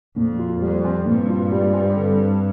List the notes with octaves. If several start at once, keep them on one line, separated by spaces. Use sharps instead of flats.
F2 A#2
F4
F2 G3
C4
G2 A#2
F4
G3
C4
D3